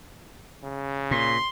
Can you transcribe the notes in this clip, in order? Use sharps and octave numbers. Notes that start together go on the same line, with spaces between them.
C#3
A#2 C6